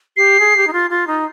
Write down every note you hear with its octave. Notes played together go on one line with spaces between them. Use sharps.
G4 C7
G#4
G4
D#4
F4
F4
D#4